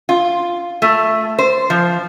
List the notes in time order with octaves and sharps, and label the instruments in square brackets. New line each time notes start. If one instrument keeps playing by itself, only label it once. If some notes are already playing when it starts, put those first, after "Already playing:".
[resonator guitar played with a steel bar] F4
A3
C5
F3